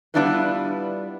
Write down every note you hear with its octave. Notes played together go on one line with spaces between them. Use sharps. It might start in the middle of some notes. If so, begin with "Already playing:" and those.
G3 B3 D4 E4 F4 B4